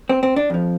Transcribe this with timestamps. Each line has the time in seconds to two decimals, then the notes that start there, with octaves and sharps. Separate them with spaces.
0.09 C4
0.23 C4
0.36 D4
0.50 F2 F3